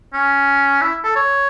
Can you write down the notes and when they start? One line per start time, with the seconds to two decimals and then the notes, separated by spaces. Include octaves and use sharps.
0.14 C#4
0.82 E4
1.04 A4
1.16 C#5